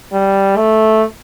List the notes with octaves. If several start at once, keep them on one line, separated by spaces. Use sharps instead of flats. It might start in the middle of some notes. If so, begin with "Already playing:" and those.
G3
A3